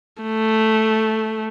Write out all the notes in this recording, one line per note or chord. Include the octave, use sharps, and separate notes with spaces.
A3